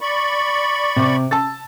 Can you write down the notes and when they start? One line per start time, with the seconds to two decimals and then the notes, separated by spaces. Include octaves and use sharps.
0.01 D5 B5 C#6
0.96 C3 D6
1.31 A5 E6 A6